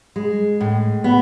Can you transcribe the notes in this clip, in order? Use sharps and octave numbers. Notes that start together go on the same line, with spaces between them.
G#3
A2
B3